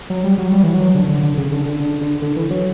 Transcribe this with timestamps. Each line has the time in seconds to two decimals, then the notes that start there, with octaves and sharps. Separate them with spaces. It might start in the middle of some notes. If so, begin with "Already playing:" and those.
0.10 F#3
0.24 G3
0.38 F#3
0.52 G3
0.63 E3
0.74 F#3
0.95 D3
1.09 D3
1.23 D3
1.37 C#3
1.52 D3
1.65 D3
1.80 D3
2.01 D3
2.22 D3
2.37 E3
2.51 F#3